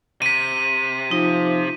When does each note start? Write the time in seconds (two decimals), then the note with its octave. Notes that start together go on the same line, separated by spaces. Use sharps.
0.22 C3 B6 D#7
1.11 F3 D#4